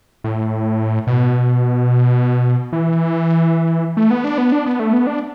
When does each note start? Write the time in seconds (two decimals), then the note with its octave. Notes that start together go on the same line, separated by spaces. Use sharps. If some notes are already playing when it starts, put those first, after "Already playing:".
0.24 A2
1.07 B2
2.73 E3
3.97 A3
4.11 B3
4.24 D4
4.38 B3
4.52 D4
4.66 B3
4.80 A3
4.93 B3
5.07 D4